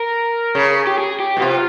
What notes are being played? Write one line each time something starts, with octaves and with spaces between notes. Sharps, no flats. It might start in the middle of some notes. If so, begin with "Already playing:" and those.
Already playing: A#4
C#3
G4
G#4
G4
B2
C3 F4